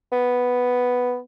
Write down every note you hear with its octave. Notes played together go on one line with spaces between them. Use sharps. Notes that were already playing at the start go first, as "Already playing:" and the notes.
B3